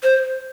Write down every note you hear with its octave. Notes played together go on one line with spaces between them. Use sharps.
C5